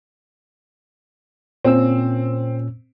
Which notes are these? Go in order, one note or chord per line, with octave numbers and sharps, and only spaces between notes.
A#2 C4 C#4 E6